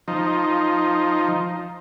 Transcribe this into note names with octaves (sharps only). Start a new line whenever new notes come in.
F3 D#4